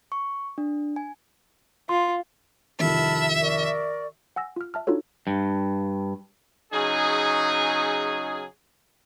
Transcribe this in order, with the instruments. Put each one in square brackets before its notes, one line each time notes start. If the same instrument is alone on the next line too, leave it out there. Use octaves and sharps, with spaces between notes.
[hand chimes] C#6
D4
G#5
[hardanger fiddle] F4 [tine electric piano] C6
[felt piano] C2 F2 D#3 [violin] E5 [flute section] A5 B5 F6
[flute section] A#4 D5 C#6
[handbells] F#5 G#5 E6 A#6
F4 F6
E5 A5 F6
D4 D#4 F4 F#4 A4 C#5
[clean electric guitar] G2
[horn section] C#3 F#3 D#4 G#4